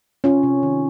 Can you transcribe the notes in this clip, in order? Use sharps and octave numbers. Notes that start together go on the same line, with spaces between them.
C3 C#4 F4
C3
D#3